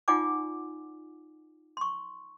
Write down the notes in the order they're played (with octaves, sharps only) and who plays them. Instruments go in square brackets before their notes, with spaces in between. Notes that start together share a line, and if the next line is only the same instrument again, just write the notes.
[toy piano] D#4 F4 D5 F#5 G#5 D6
C6 C#6